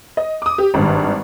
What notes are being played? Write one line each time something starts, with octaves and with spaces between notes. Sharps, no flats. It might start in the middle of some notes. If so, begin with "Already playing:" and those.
D#5
D6 D#6
G4
G#1 G2